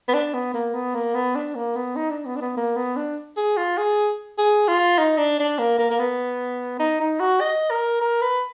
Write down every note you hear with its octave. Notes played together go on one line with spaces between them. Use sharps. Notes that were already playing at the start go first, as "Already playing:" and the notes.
B3
D4
B3
A#3
B3
A#3
B3
D4
A#3
B3
D#4
D4
B3
D4
B3
A#3
B3
D4
G#4
F4
G#4
G#4
F4
D#4
D4
D4
A#3
A#3
A#3
B3
D#4
D#4
F#4
D#5
A#4
A#4
B4